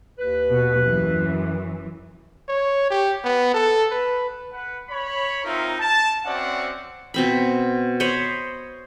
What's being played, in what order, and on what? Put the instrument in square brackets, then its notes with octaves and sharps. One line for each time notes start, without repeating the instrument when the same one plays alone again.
[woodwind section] D#2 B4
[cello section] B2
F#2 E3
[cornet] C#5
G4
B3
A4
B4
[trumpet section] B4 F#5
C#5 B5
C4 D#4 F4 A#4 E5
A5
C4 C#4 F#4 D5 E5 F#5
[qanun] B2 C4 B5
C5 C#5 D#5 B5